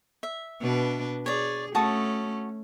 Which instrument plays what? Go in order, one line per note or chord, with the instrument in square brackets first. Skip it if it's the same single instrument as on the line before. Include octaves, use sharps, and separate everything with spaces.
[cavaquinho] E5
[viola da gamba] B2 D4 B4
[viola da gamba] G#4 [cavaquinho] C#5 D5
[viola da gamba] A3 C#4 [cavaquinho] F#4 A5 D#6